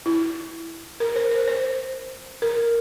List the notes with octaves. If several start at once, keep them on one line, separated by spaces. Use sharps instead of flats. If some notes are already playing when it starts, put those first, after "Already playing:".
E4
A#4
C5
C5
C5
A#4